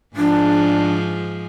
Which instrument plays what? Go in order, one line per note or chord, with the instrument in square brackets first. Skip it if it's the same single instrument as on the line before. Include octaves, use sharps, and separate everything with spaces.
[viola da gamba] G#2 F3 G#4 [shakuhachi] D4